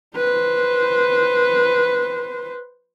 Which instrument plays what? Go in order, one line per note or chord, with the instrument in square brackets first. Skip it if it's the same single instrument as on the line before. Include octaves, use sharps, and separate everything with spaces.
[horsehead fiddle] B4 C5